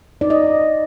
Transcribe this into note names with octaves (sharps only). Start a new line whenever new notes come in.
D#4 D5
D#5